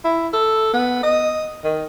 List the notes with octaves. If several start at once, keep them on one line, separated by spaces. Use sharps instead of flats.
E4
A4
B3
D#5
D#3